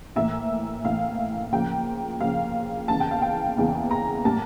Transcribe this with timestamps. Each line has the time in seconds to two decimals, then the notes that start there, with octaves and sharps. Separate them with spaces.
0.16 A2 E3 A#3 E5
0.84 A2 E3 A#3 F5
1.52 C#3 F3 A#3 G5
2.20 C#3 F3 A#3 F5
2.88 E2 C#3 E3 A#3 A5
3.00 G5
3.11 F5
3.22 G5
3.57 E2 C#3 E3 A#3
3.91 A#5
4.25 A2 G3 A#3 A5